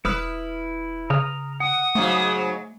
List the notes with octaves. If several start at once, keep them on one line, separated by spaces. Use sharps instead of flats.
E1 E4 B4 D#6 F6
C#3 A#5 D#6 F6
F#5 D#6
G#2 C#3 F#3 A3